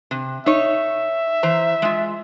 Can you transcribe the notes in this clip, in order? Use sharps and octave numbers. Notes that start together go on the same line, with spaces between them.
C3
D#4 C#5 E5
E3 C5 A#5
G#3 F4